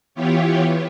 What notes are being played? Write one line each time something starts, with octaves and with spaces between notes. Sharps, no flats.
E3 B3 E4 F4 G4 C#5